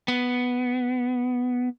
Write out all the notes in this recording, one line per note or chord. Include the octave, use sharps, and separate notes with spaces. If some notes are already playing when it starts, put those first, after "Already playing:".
B3